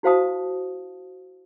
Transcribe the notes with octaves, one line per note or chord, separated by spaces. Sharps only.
E4 F#4 C5 F5 A5 D#6